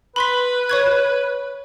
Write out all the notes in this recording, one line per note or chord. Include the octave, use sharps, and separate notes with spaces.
B4 B5 C6 B6
C#5 C#6 G#6